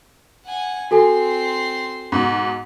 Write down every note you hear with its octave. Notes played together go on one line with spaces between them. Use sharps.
F#5 G#5
C4 F#4 A4 G#5 C6
G#2 B2